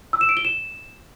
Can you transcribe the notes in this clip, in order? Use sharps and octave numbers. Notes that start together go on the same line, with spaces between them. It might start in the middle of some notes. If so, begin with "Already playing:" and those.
E6
E7
D7
G7
E7